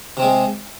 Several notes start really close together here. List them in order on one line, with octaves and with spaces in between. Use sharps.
C3 C4 G#3